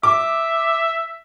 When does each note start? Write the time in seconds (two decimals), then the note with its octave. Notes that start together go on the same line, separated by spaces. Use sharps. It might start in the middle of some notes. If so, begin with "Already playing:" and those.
0.03 E5 D6